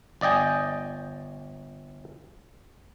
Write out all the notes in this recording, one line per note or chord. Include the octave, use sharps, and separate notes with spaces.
G1 D5 D#5 G5 G#5